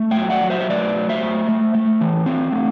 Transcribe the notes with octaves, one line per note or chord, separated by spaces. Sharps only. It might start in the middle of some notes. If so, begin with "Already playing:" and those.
Already playing: A3
E5 G5
F#3
D5 F#5
F#3
C5 E5
E5
A3 B4 D5
F#3
C5 E5
A3
A3
A3
E3
C4
A3